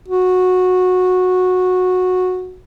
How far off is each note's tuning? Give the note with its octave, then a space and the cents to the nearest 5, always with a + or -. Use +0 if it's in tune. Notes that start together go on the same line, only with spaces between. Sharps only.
F#4 -15